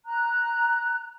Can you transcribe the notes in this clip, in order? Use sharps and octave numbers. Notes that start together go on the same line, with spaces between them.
A#5 F#6